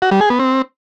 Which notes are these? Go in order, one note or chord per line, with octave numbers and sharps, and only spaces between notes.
F#4
G3
G#4
B3
C4